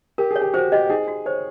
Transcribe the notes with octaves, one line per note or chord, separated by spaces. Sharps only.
G4 A#4
G#4 C#5
G4
F#4 C5
G4 D#5
D#4 G#4
F#4
C5 C#5